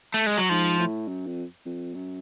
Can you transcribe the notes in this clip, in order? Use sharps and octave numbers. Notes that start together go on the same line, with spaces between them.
A3
G#3
F#3
G#2 F3
A2
F#2
F2
F2
F#2